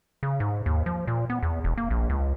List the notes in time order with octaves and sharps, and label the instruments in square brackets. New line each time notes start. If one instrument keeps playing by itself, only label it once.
[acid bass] C#3
G#2
D#2
F3
A#2
B3
E2
E1
A#3
A#1
C#2